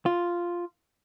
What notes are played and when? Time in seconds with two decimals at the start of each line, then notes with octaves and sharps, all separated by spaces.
0.06 F4